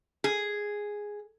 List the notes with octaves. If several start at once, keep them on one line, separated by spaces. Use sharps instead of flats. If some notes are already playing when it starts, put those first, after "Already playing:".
G#4